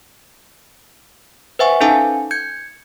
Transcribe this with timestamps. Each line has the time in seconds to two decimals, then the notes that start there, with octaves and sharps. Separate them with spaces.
1.59 B4 C5 E5 F#5 G#5 C#6
1.81 C#4 D#4 A4 F5 G#5 A5
2.31 G6 G#6 C#7